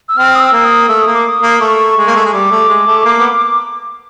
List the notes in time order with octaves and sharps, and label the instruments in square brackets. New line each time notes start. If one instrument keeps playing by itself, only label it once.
[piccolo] E6
[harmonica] C4 [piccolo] F6
[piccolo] D#6
E6
[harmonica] A#3
[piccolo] D#6
[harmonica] A3 [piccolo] E6
[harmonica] A#3 [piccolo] D#6
[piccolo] D6
D#6
[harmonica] A#3
[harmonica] A3 [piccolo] C#6
[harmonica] G#3
A#3
A3
[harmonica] G#3 [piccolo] C#6
[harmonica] G3 [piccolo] D6
[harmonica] A3
G#3
A3
A#3
B3